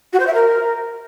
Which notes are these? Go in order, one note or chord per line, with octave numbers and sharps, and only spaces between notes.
F#4
C5
E5
A#4